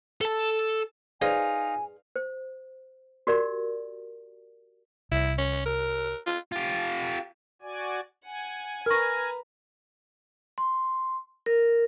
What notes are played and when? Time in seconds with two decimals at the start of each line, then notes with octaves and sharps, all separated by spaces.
0.21 A4 A5
1.21 D#4 F4 G#4 B4 C5 D5 G#5
2.16 C5
3.27 F#4 G4 A#4 D5
5.11 C2 E4
5.38 C#4
5.66 A#4
6.27 F4
6.52 F4 G4
7.62 F#4 D5 G#5
8.25 F#5 G#5
8.86 A#4 B4 A#5 C#6 F6 A#6
10.58 C6
11.46 A#4